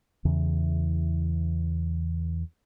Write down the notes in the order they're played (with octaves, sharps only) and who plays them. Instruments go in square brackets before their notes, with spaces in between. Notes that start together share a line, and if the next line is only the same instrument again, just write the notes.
[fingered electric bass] E2 C#3 E3